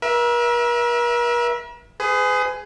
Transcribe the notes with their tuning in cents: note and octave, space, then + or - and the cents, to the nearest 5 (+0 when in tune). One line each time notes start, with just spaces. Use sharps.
A#4 +45 E5 +0
G#4 +5 B4 +40